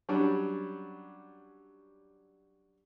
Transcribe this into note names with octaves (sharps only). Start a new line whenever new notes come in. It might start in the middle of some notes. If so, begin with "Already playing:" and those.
F#3 G3 C#4 D4